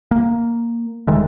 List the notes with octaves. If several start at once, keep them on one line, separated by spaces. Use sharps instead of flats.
A#3
E1 D#3 G#3 A3